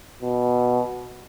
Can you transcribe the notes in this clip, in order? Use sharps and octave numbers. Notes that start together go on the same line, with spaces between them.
B2